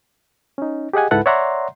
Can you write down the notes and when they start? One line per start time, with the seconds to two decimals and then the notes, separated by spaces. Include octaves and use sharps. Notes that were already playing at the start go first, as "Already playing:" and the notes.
0.58 C#4 D#4
0.93 G4 G#4 D#5 F#5 G#5
1.11 C#2 G#2 E4 A4 B4 F#5
1.26 C#5 D5 E5 F#5 A#5 C6